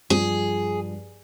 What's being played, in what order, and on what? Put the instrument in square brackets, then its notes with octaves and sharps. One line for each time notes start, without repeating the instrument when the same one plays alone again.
[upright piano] G2 F3 [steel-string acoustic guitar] G#4